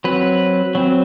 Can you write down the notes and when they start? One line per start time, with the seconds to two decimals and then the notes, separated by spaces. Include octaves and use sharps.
0.04 F#3 C4 B4
0.75 F#3 C4